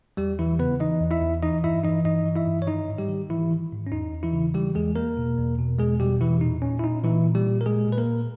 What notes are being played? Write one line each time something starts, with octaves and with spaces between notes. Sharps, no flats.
E2 G3 G4
E2 E3 E4
C#3 B3 B4
E3 D#4 D#5
E2
E4 E5
E2
E3 D#4 D#5
G2 E4 E5
E3 D#4 D#5
G2 D#4 D#5
E3
E4 E5
G2
C#5
D#3 D#4 D#5
G#2
G3 G4
D#3
G#2 E3 E4
D#3
G#2
C#4
E2 D#4
E2
E3 E4
C#3
E3 G3 G4
E2 G#3 G#4
E2 A#3 A#4
B2
E2
B2
E2 G#3 G#4
B2 G3 G4
E2 E3 E4
A#2 D#4
A#2 C#4
E4
A#2 D#4
A#2 E3 E4
A#2
G3 G4
A#2
A#4
A#2 G#3 G#4
A#2
B4
A#3 A#4
A#2